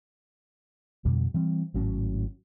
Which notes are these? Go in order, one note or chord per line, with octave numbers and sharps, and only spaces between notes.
F2 B2 D3 G3
E3 G3 C4
G#1 A2 F#3 C#4